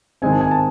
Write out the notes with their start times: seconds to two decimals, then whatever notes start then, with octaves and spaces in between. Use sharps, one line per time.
0.22 G#2 D#3 G#3 C4 G#5
0.32 A5
0.41 G#5
0.51 A5